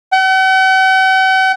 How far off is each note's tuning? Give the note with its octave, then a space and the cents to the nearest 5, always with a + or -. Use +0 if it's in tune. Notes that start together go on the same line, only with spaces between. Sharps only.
F#5 +45